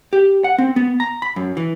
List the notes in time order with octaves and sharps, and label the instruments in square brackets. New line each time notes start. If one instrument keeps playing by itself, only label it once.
[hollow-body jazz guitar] G4
F#5
C4
B3
A#5
B5
F#2
E3